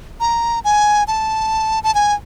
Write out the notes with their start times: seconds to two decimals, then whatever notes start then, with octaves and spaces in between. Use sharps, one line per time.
0.20 A#5
0.64 G#5
1.08 A5
1.84 A5
1.95 G#5